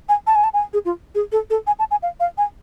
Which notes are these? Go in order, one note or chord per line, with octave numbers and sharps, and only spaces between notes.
G#5
A5
G#5
A5
G#5
G#4
F4
G#4
A4
A4
G#5
A5
G#5
F5
F5
G#5